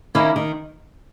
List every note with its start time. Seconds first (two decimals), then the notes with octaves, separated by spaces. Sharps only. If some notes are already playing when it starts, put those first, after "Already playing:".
0.15 D#3 A#3 C#4 E4
0.36 D#3